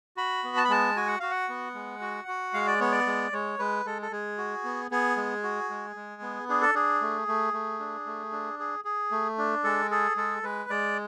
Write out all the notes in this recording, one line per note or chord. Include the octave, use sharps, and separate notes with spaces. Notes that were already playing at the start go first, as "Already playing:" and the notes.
F#4 B5
B3
A5
B5
G#3 A5
F#4 G#5
F#5
F#4 F5
F#5
B3
G#3
F#4
F#4
G#3 F5
D5
B3 C#5
D5
G#3
G#3 C#5
G#3 B4
G#3 A4
A4
G#3 G#4
F#4
B3
B3 G#4
G#3
F#4
G#3
G#3
B3
D4 G#4
A4
D4 G#4
A3
A3
A3
D4
A3
D4
G#4
G#4
A3
D4
G#3 A4
G#4 A4
G#3 A4
G#3 B4
G#3 D5